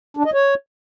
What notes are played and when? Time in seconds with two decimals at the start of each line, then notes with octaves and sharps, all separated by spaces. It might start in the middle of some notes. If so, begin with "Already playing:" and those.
0.17 D4
0.25 D#5
0.34 C#5